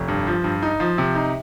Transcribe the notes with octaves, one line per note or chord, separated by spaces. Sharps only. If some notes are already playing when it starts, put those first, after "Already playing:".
Already playing: F1
G2
F3
G2
D#4
F3
C3
D#4